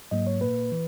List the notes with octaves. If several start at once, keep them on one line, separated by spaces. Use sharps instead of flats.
G#2 F#3 A#3 D#5
C#5
A#2 A#3 B4
E3